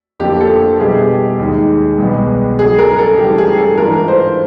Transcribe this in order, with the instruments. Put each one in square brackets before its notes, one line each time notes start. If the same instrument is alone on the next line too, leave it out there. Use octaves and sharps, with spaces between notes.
[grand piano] F2 D3 F3 A#3 [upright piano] G4
[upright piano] A4
[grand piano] B2 G3 B3 E4 G4 [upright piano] G#4
[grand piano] D#2 D#3 G#3
C2 B2 G#3 B3
[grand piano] F#2 C#3 F#3 [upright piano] G#4
[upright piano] A#4
A4
[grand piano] G2 E3 A3 C#4 [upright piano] G4
[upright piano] G#4
A4
[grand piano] G#2 E3 A3 D4 F4 [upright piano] A#4
[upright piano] C5